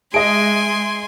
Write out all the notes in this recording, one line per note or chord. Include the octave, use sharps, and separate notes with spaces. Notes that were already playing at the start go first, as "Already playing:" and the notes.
G#3 G#4 D#5 E5 G#5 C6 D7